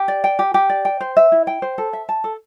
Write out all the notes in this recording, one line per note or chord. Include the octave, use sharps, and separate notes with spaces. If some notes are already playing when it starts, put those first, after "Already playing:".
Already playing: G4
D5
G5
G4
G4
D5
G5
C5
E5
E4
G5
C5
A4
E5
A5
A4